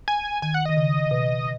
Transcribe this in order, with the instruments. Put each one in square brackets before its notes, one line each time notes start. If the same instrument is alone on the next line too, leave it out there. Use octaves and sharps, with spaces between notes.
[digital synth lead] G#5
[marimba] D#3 [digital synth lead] G#5
[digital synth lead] F#5
[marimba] D#3 [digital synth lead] D#5
[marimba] C#3
B2